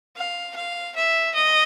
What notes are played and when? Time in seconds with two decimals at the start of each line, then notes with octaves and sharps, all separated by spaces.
0.17 F5
0.55 F5
0.96 E5
1.35 D#5